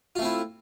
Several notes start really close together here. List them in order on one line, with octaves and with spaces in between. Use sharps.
F4 A3 C4 E4